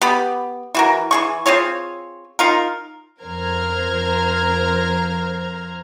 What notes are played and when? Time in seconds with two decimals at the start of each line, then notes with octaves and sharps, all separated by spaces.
0.02 B3 G4 B5
0.75 E3 F#4 A#4
1.11 E3 G#4 C#6
1.46 C4 F4 G#4 C#5
2.39 D#4 F4 A#4
3.22 F2 A#4 C5 A#5 F6 G#6